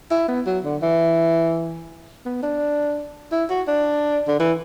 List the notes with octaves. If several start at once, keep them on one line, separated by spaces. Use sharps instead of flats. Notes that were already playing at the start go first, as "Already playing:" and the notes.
E4
B3
F#3
D3
E3
B3
D4
E4
F#4
D4
D3
E3